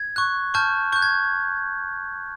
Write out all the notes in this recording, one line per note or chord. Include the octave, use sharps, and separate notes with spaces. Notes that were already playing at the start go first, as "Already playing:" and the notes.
Already playing: G#6
C#6 F#6
A5 C#6 F6 G6
C#6 F#6 G6
G#6